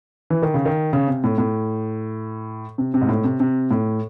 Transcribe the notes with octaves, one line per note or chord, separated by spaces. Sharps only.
E3
D#3
C#3
D#3
C#3
C3
A2
A2
C3
C3
G#2
A2
C3
C3
A2